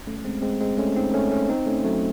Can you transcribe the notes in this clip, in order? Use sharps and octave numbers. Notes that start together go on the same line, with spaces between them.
A3 C#4
A3
G#3 C4
G#3 C4
G#3 C4
A3 C#4
C4 D#4
A3 C#4
A3 C#4
C4 D#4
A3 C#4
F#3 A3